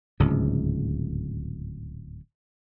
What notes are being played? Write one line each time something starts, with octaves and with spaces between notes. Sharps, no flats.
D1 C#2 G#2